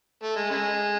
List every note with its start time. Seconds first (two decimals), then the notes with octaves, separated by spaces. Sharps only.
0.23 A3
0.36 G#3
0.50 C#3 G#3